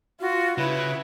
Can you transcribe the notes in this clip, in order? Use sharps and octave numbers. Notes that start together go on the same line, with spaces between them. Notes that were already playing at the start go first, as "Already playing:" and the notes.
F4 F#4
C#3 E4 B4